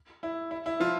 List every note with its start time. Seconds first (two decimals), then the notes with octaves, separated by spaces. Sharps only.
0.23 E4
0.51 E4
0.66 E4
0.80 F3 F4